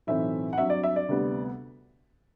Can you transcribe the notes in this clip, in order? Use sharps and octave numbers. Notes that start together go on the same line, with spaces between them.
B1 A2 E3 A3 C4 E5
F#5
G2 F#3 C4 E5
D5
E5
D5
D2 C3 G3 B3